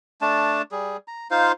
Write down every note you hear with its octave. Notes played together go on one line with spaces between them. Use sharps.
A3 D4 A5
G3 G#4
A#5
D#4 F4 C5 F5